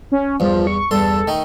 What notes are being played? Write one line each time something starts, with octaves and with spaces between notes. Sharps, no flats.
C#4
E2 G2 F3
C#6
E2 G2 A4 C6
D#3 A3 D#4